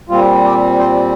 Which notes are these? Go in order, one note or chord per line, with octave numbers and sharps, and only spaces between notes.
A#2 G3 C4 F4
G4
C5